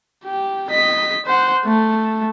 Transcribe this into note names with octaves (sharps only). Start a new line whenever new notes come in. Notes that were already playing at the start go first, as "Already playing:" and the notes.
G4
D#5 B6
C5 F#5
A3